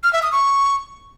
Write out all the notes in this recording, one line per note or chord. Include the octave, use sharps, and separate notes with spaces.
F6
E5
D#6
C#6